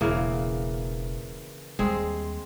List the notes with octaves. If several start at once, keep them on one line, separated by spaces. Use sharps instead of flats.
E1 C#3 E3 A#3
D#2 G3 G#3 C4 G#4